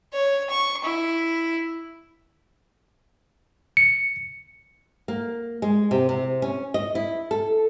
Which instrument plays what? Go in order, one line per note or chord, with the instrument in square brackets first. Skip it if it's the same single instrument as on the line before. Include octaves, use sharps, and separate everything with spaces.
[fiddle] C#5
C#6
E4
[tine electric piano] C#7
[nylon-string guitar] A#3
G#3
C3
C3
C#4
D#5
E4
A4